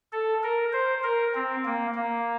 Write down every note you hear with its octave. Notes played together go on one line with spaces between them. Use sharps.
A4
A#4
C5
A#4
C4
A#3
A#3